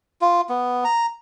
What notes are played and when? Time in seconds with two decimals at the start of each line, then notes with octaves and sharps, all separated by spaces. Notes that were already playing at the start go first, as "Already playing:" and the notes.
0.21 F4
0.49 B3
0.84 A#5